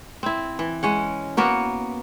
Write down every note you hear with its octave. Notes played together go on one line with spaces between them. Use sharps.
C4 E4
E3
G#3 C#4 F#5
A#3 B3 F#4 A#4